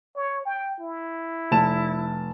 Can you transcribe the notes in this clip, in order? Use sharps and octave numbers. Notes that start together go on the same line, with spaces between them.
C#5
G5
E4
F1 A5 E7